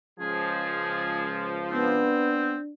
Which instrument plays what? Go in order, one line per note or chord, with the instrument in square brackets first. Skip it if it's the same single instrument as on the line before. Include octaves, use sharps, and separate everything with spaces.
[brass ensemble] C#2 F3 [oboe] G#4
[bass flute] B3 [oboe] C4 [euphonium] D4